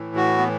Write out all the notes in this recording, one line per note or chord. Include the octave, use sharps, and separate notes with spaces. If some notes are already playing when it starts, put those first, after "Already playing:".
Already playing: A2 E3
F#4
B3